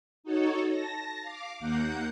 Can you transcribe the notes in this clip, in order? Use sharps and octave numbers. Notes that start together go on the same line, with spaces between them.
D#4 F#4 A4 C#5
A5 A#6
F5 D6
D#2 A#3 F#5 F#6 G6